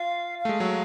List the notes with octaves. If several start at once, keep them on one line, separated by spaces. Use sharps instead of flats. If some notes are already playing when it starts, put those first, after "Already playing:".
Already playing: F4 F5
F5
A3
G#3
F#3